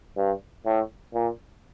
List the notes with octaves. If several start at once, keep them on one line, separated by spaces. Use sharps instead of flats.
G2
A2
A#2